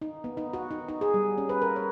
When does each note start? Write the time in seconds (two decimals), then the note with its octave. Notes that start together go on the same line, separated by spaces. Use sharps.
0.02 D#4
0.24 B3
0.37 D#4
0.53 F#4
0.71 D#4
0.88 D#4
1.01 G#4
1.14 G3
1.38 C#4
1.49 B4
1.62 A#4
1.76 C#5